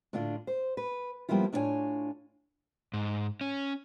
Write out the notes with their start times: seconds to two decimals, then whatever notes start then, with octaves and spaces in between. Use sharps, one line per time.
0.13 A2 D3 D4 F4
0.47 C5
0.77 B4
1.29 F3 G3 A#3 B3 E4 F4
1.53 A2 D4 E4 F4 C#5 G#5
2.93 G#2
3.41 C#4